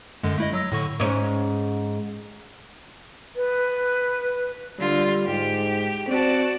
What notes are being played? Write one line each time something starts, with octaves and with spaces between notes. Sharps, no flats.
F#2 D3 G#3
A3 E4 D#5
F#3 E6 A#6
A2 D3 C#6
G#2 C#4
B4
D3 G3 F4
G#2 G4
C4 F#4 D5 A5